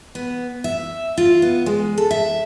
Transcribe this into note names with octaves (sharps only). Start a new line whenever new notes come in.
B3
E5
F4
B3
G#3
A4
E5